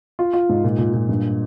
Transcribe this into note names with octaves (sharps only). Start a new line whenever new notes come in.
F4
F4
G#2
A#2
A#2
A#2
G2